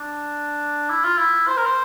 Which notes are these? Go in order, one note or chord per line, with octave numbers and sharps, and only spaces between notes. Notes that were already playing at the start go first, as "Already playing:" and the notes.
Already playing: D4
E4
F4
E4
C5
A#4
C5